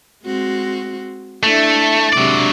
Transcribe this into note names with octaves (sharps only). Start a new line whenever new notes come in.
G#3 C4 F#4
A3 D4 E4 A4
C3 F#3 G#3 D4 D5